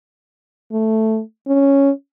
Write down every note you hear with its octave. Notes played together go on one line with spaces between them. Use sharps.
A3
C#4